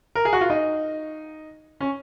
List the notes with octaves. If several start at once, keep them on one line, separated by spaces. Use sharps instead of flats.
A#4
G#4
F#4
F4
D#4
C#4